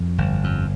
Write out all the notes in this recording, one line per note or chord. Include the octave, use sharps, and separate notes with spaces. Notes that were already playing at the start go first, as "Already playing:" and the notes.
Already playing: F2
G1
F2